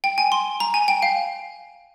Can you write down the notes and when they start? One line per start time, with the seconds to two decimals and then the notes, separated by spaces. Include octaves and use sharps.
0.04 G5
0.18 G#5
0.32 C6
0.60 A#5
0.74 G#5
0.88 G5
1.02 F5